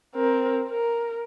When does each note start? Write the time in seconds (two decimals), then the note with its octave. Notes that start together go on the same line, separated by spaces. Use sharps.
0.15 C4 A#4
0.69 A#4